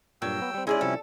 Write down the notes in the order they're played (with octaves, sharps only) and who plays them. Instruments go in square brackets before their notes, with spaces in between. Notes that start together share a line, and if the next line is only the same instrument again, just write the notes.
[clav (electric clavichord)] G2 A#2 [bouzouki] F#3 [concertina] G5 E6
[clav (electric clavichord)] B3
G3 C4
[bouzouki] G#3 G#4 D5 [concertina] C#4 E4 [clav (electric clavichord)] D#4 E5
[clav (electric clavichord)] C3 F3 G3 [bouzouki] A4